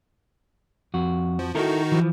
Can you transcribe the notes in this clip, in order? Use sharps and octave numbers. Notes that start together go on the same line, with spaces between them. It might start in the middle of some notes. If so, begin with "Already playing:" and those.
F2 F#4
F3
D#3 D#4 E4 F#4 A4 A#4
E3 F3